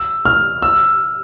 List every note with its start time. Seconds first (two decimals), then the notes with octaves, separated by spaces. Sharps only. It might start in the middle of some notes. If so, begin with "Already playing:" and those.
Already playing: E6
0.25 F6
0.62 E6